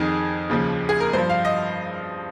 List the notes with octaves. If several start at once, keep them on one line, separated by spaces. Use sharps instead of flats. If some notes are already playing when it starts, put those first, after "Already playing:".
Already playing: F2 D#3 G#4
D#2 C#3 F3
G#4
A#4
G2 F3 C5
F5
D#5